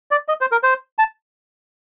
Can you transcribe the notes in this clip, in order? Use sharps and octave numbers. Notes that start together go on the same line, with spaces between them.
D5
D#5
C5
A#4
C5
A5